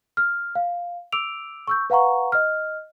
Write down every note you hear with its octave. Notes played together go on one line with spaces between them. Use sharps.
F6
F5
D6 E6 D7 F7
C#6 E6 G6
B4 F5 F#5 A#5 C#6
D#5 F6